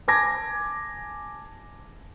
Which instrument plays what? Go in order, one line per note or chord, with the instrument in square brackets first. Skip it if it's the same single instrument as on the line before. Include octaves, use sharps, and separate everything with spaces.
[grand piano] G#5 A5 D6 G#6 A#6